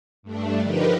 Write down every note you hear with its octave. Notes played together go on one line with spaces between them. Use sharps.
G2 A3 D4
D3 F3 D#4 G4 A#4 B4